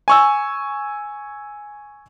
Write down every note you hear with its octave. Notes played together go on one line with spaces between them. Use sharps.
G#5 C#6 E6